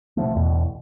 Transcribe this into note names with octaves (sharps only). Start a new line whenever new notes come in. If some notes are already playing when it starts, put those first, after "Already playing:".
B2 F3 A3
A1 E2 B2